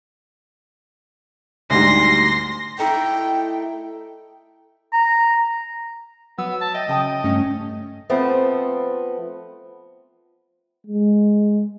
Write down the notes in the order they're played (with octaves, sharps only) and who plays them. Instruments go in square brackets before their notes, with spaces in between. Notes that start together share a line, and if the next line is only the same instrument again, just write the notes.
[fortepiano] D2 G#2 G3 [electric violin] C6 A#6
[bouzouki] A3 D#4 E4 [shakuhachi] G5
[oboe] A#5
[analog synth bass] F#3 [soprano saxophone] B3 [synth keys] E6
[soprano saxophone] A5
[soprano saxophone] D#5 [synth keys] E5 G5
[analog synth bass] C#3 [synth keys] G5 A5 D#6
[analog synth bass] G2 [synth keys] A3 C#4
[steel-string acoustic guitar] F3 A3 B3 C4
[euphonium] G#3